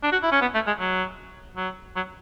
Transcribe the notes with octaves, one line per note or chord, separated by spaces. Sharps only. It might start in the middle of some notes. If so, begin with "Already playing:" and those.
D4
F#4
E4
C#4
B3
A3
G#3
F#3
F#3
F#3